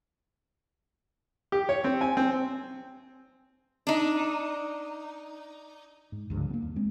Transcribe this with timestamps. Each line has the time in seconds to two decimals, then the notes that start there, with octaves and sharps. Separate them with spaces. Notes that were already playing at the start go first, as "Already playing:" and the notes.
1.52 G4
1.69 C#5
1.84 C4
2.01 G#5
2.17 C4
3.87 D4 D#4
6.12 G#2
6.30 C#2 G2 D3 F3
6.50 A#3 B3
6.62 D#2
6.76 G#3 C4